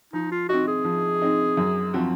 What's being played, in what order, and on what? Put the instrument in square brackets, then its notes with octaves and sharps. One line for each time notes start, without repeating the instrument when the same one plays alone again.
[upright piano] F3 [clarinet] D#4
[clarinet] F4
[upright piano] C4 D#4 [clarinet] F#4
[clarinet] G#4
[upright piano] F3
C4 D#4
F#2
F3 C4 F#4